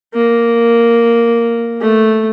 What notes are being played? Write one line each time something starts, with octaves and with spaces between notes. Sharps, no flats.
A#3
A3